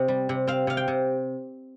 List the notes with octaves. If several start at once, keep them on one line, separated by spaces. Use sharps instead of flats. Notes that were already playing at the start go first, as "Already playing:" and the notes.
Already playing: C3 C4 D#5
G3
C3
C4 F5
C3 F5
G5
C3